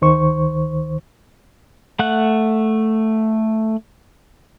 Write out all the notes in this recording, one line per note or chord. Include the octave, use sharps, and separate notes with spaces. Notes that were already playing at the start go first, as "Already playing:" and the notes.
D2 D#3 C5 C#6
A3 F#5 F#6